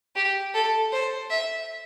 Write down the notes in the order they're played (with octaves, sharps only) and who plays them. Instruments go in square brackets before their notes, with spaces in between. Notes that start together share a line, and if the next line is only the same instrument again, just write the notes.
[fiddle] G4
A4
C5
E5